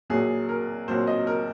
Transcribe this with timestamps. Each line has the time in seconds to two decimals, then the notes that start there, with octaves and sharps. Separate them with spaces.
0.10 A#1 A#2 F#3 G#4
0.49 A#4
0.88 A#1 A#2 F#3 C5
1.07 D#5
1.27 A#4